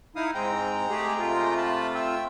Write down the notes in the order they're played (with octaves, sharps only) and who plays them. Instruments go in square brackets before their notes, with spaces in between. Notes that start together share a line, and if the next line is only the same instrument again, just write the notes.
[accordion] D#4 E4 D#6 [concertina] F5
[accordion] G#2 C4 [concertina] G#3 G5 A#5
[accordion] A3 G4 G#4
C3 A3 F4
[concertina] A5 B5
E5 G5 E6